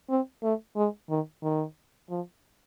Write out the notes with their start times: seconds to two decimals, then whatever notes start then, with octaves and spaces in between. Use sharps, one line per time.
0.09 C4
0.43 A3
0.76 G#3
1.10 D#3
1.43 D#3
2.10 F3